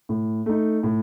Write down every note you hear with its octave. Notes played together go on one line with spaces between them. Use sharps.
A2
A3 D#4
A2